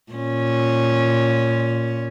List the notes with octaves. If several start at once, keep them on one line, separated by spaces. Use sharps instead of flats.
A#2 C#4